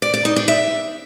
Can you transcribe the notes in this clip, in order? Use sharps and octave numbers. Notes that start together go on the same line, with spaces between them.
D5
D5
D#4
D4
E5